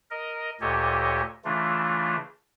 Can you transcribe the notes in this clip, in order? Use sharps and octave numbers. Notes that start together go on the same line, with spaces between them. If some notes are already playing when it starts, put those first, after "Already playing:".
A#4 D#5
D2 A#2 G4 A4 C#5 D#5
C#3 E3 A3 D4 F4